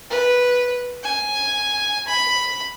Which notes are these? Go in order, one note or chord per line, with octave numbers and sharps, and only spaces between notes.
B4
G#5
B5